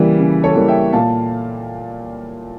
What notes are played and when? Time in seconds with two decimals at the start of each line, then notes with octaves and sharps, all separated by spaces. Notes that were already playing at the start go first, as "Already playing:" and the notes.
Already playing: C#3 E3 G3 A#3
0.19 C#3
0.44 A4 C#5
0.56 E3 G3 A#3
0.68 E5 G5
0.93 A#2 F5 A5